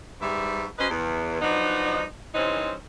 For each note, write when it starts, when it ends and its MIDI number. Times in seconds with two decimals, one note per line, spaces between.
0.21 0.65 44
0.21 0.65 55
0.21 0.65 67
0.21 0.65 71
0.21 0.65 76
0.78 0.86 54
0.78 0.86 61
0.78 0.86 71
0.78 0.86 72
0.78 0.86 75
0.91 1.40 40
1.41 2.04 53
1.41 2.04 54
1.41 2.04 59
1.41 2.04 62
1.41 2.04 63
2.35 2.74 43
2.35 2.74 52
2.35 2.74 60
2.35 2.74 61
2.35 2.74 63
2.35 2.74 72